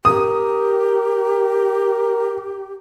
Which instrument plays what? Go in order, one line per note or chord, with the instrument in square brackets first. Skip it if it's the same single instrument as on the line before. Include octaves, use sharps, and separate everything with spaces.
[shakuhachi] G4 [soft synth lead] A#4 [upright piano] D#6